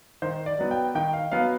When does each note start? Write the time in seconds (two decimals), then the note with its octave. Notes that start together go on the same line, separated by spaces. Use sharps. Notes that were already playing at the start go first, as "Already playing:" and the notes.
0.22 D#3 C5
0.46 D5
0.58 F#3 B3
0.71 G5
0.95 D#3 G5
1.13 F5
1.31 F#3 B3 F5